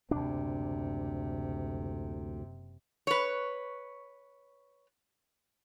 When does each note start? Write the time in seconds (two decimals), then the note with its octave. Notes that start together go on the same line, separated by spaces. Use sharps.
0.11 F#1 D2 C3 D4
3.07 B4 C#5